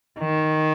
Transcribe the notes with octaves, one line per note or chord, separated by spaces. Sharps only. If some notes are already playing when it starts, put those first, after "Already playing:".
D#3